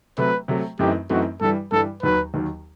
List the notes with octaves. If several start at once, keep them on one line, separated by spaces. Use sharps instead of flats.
C3 F#3 A3 B4
C3 F#3 A3
F#2 E3 A3 C4 D#4 G4
F#2 E3 A3 C4 D#4 F#4
G2 E3 G3 A4
G2 E3 G3 A4
D#2 D#3 F#3 B4
D#2 D#3 F#3